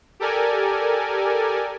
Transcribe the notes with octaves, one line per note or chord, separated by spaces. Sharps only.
G4 A4 A#4 D5 G#5